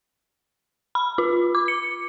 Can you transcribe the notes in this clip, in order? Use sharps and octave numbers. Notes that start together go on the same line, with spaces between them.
B5
F4
D6
C#7